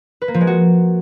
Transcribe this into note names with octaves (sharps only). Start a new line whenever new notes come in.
B4
A#3
F3
G#3
F#4